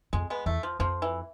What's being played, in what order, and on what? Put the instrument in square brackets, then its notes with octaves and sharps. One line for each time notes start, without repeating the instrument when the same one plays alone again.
[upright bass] F2 [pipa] G#3
[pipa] G#3 B3
[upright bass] E2 [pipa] A3
[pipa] F3
[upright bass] F2 [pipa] F3
[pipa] E3